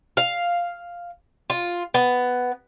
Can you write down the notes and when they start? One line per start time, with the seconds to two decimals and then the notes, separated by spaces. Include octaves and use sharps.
0.17 F5
1.50 F4
1.94 B3